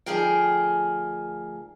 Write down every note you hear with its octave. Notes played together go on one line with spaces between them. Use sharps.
D2 F3 G#4 A#4 G5